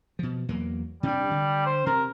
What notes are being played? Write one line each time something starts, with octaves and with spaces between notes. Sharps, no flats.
B2 F3
E2 F#3 A#3
C3 G3 C4 D4
D3
C5
C3 A#4